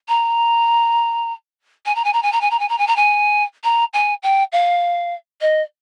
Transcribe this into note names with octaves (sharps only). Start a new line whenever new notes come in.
A#5
G#5
A#5
G#5
A#5
G#5
A#5
G#5
A#5
G#5
A#5
G#5
A#5
G#5
A#5
G#5
G5
F5
D#5